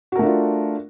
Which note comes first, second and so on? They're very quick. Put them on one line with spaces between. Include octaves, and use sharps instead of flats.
F#4 A#4 A3 D4 F4